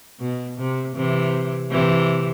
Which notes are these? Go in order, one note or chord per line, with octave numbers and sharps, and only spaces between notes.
B2
C3
C3 E3
C3 E3